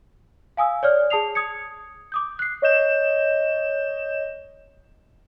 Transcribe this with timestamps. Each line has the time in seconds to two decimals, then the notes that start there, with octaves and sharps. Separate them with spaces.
0.57 F5 G#5 D#6 E6
0.83 C#5 D5 F6
1.10 G#4 A5 D#6 C7 F7
1.35 D#6 G#6 C#7
2.12 D6 D#6 G6
2.39 F#6 C7
2.62 C#5 D#5 G6 E7